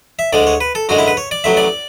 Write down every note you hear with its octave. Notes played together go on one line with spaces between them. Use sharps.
E5
D2 D3 G#3 D5
C#5
B4
A4
F#2 D3 G#3 F#4
E4
B4
C#5
D5
A1 A2 F#3 E5
D5